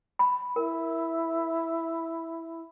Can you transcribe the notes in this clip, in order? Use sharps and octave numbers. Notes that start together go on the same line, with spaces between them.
B5
E4 A#4